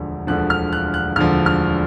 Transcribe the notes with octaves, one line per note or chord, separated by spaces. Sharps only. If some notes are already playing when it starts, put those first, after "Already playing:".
Already playing: E1 D2 D3 F3
E1 D2 D3 F3 F#6
F6
F#6
F#6
E1 D2 D3 F3 F6
F6